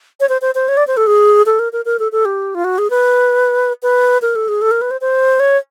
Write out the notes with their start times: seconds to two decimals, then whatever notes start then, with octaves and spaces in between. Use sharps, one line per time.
0.20 C#5
0.29 C5
0.42 C5
0.55 C5
0.68 C#5
0.77 D5
0.87 C5
0.97 A4
1.07 G#4
1.46 A4
1.59 A#4
1.73 A#4
1.85 A#4
1.99 A4
2.12 A4
2.25 G4
2.55 F4
2.64 F#4
2.78 G#4
2.90 B4
3.83 B4
4.22 A#4
4.35 A4
4.48 G#4
4.62 A4
4.71 A#4
4.81 B4
4.91 C5
5.01 C5
5.40 C#5